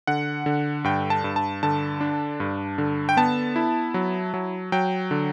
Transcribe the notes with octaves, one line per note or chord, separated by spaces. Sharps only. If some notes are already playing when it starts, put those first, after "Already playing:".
D3 F#5
D3
G2 G5
A5
G2
A5
D3 A5
D4
G2
D3
G5
B3 A5
E4
F#3
F#3
F#3 G5
D3